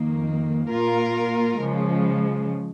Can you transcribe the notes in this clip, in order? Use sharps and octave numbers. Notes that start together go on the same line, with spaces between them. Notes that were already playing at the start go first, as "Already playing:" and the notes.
Already playing: F2 D#3 A#3
A#2 A#3 F4 A#4
C#3 F3 G#3